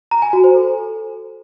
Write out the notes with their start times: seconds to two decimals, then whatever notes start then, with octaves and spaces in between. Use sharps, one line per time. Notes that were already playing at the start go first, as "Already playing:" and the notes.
0.11 A#5
0.22 G#5
0.33 F#4
0.44 C5
0.55 A4